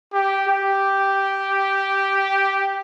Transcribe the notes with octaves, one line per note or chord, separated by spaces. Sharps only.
G4
G4